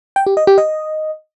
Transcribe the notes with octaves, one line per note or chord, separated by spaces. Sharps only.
G5
G4
D#5
G4
D#5